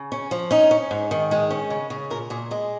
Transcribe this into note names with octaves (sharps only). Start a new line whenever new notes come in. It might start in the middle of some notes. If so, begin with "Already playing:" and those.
Already playing: C#3
C#4
F3
C#4 D#4
C#4
G#2
D#3
G#3 G#4
C#4
C#3
C#3
A#2 A#4
A#2 G#4
G#3 G#4